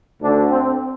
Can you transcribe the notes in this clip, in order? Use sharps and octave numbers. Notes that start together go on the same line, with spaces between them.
D2 D3 D4
C4